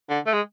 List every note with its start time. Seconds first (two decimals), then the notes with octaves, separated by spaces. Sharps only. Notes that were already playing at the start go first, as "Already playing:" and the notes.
0.10 D3
0.26 A3
0.34 G#3